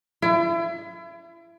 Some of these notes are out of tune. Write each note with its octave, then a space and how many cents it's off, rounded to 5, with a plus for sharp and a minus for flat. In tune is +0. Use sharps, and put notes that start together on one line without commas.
E4 +35